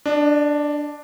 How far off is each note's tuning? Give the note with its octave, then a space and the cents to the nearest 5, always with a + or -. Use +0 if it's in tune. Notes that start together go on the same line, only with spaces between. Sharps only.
D4 +0 D#5 -40